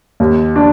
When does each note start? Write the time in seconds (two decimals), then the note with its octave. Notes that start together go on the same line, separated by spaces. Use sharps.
0.20 D#2
0.56 D4